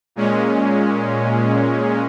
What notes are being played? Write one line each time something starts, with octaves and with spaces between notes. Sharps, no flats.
A#2 G#3 C#4